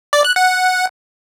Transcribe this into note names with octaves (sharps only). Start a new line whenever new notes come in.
D5
F#6
F#5